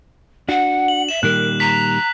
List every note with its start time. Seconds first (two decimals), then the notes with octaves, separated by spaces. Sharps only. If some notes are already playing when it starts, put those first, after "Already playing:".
0.49 D4 F#4 F#5
0.88 F#7
1.09 E5 E7
1.23 A#2 D#3 G3 A#4 F#6
1.60 A#5 B6